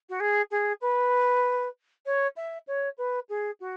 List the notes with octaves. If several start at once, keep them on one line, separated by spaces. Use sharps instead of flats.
F#4
G#4
G#4
B4
C#5
E5
C#5
B4
G#4
F#4